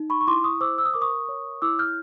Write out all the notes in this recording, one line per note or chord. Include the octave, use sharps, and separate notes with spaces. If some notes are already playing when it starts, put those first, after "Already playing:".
Already playing: D#4
B5 C#6
C#6
E4 C6 D6
C#6 D#6
C5 D6 E6
E6
D#6
A#4 D6
C#6 D#6
C#5
E4 D6 E6
F6 G6